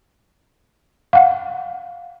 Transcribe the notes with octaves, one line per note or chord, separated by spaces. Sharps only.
F5 F#5